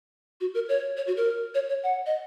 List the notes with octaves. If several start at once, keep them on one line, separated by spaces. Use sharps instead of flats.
F#4
A#4
C#5
C#5
F#4
A#4
C#5
C#5
F#5
D#5